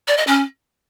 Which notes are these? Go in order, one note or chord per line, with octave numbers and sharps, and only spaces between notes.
D5
D#5
C#4